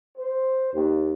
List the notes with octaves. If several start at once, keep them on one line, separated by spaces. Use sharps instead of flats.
C5
D#2